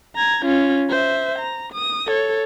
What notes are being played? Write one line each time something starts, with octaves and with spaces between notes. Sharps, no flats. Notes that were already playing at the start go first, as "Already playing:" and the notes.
A#5 G#6
C#4 F4
C5 E5
A#5
D#6
A4 C#5